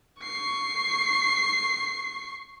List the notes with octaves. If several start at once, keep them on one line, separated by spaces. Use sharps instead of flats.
C#6 C7